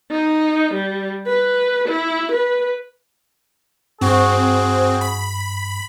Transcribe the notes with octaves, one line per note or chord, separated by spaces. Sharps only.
D#4
G3
B4
E4
B4
G2 C4 F#4 G#4
B5